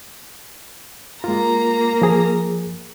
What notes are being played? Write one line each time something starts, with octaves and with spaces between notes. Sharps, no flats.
G#3 A#3 F4 A#5
F3 G#4